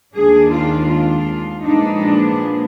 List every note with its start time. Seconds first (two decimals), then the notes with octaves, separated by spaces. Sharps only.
0.14 D#2 D#3 G#3 D4 G#4
0.52 F4
0.90 F4
1.63 A#2 F3 G#3 B3 D4 D#4
2.01 D4